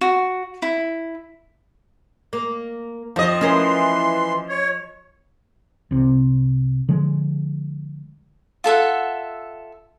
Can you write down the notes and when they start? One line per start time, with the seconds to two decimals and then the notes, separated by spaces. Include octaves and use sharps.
0.01 F#4
0.62 E4
2.33 A#3
3.16 F2 F3 D#5
3.41 E3 C#4 A#4 C6
4.49 C#5
5.91 C2 C3
6.89 D3 F3 G#3
8.64 F4 A4 E5 F#5